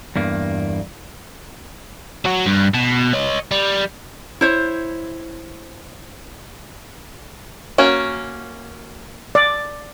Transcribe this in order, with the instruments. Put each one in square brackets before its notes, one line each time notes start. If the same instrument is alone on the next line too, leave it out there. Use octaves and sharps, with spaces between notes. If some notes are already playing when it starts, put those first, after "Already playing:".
[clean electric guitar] E2 G2 A#3
[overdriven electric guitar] F#3 F#4
G2
B2
C#5 D#5
G3
[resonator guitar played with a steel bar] E4 C5 C#5
[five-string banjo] A#3 C#4 F#4
[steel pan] D5